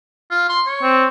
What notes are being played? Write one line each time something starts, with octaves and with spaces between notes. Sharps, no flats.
F4
C6
C#5
C4